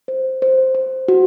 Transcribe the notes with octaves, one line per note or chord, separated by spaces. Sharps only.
C5
C5
C5
F#4